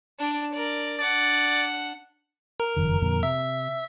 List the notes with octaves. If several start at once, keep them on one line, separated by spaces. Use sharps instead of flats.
D4 D5
A#4 D5
D4 D5 F#5
A#4
F#1 F2 D#3
F2 A#2 D3
C3 E5